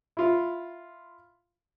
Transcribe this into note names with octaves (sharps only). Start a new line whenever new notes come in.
E4 F4